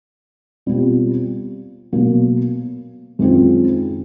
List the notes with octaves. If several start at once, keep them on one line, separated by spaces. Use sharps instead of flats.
B2 G3 C4 F4
B2 F#3 A#3
F#2 D#3 G#3 C4 F4